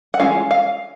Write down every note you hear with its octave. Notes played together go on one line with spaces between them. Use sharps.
F#5
E3 G#3 C#4 F4 F5
F5